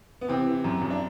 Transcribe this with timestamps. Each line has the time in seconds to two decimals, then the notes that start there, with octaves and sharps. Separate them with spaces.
0.21 B3
0.28 C3 E3 C4
0.47 E3
0.64 F#2
0.81 F#2
0.90 D4